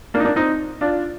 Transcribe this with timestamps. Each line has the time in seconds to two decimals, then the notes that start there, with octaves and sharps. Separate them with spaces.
0.14 A#3 D4
0.20 D#4
0.25 A#3 D4
0.36 C4 D#4
0.81 D4 F4